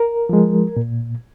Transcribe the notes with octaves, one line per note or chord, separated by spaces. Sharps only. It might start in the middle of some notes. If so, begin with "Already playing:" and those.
Already playing: A#4
F3 G#3
A#2